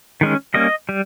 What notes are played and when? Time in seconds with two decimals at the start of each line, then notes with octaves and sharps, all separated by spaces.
0.21 D#3 G#3 C#4
0.54 G3 A#3 C#4 D#5
0.89 G3